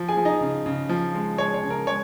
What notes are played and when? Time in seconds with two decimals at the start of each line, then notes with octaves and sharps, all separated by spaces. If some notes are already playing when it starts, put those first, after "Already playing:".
Already playing: F3
0.08 G#4 G#5
0.17 F3
0.25 D#4 D#5
0.41 C#3
0.66 C#3
0.89 F3
1.14 G#3
1.38 G#3 C#5
1.54 C#5
1.62 C#3
1.71 A#4
1.87 G#3 C#5